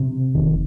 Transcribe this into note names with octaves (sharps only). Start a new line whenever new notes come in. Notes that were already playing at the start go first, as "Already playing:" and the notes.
Already playing: C3
F1 D#3